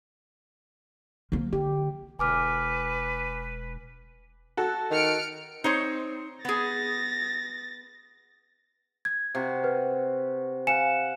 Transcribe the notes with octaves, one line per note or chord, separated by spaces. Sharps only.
F3 A#3
D3 G4
E1 B4 G#5 D6 F6
F#4 A4
D#3 F6 C#7 D7
C4 D#4 C5 C#5
B3 G#4 A6 A#6
G#6
C3 F#4
B4
F5 F#5 G#5 C#7 E7